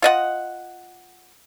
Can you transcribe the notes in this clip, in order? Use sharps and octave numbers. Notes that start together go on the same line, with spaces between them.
F4 D#5 F#5